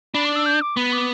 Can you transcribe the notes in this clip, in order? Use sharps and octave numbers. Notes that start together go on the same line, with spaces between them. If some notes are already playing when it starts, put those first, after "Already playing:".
D4 B5
D6
E6
G6
D6
B3 B5
D6